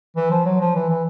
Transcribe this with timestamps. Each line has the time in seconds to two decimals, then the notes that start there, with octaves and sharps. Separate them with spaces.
0.16 E3
0.31 F3
0.45 F#3
0.61 F3
0.75 E3
0.89 E3